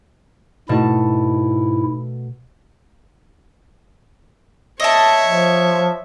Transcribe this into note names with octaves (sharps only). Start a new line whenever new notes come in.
G#2 B2 A3 E4 A5
C#5 D#5 E5 A5
F3